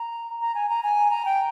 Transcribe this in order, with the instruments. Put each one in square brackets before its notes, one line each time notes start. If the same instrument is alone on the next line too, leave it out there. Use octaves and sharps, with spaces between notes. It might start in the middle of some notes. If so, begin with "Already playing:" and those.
Already playing: [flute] A#5
A#5
G#5
A#5
G#5
A#5
G5